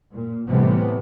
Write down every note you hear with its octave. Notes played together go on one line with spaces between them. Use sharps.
A#2
A2 C3 E3 G3 A3 B3